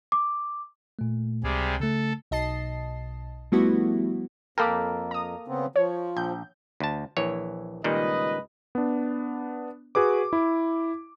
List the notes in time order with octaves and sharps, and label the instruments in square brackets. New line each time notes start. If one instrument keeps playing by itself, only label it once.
[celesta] D6
[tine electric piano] A#2 A3
[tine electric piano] C#2 [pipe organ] C3 G3 G#4
[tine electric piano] C#3 A3 [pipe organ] A4
[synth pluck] B1 D#5 A5 C7
F3 G3 A3 B3 E4 F#4
[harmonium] F2 [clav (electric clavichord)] A#3 A4 A#4 [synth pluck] G5 B5 D6
[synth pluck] A#5 D#6
[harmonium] C#3 B3 C4
[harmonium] F3 [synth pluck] C#5
[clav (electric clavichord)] A#1 [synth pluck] G6
[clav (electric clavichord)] D2 A5
A#1 E3 C#5
[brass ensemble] C#2 B4 D#5 [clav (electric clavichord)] A#2 D#3 G3
[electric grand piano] B3 D4
F#4 G#4 B4 D6
E4